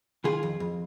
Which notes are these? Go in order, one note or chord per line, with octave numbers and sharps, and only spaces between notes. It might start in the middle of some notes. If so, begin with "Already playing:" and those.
D#3 F4 G#4
F2
F2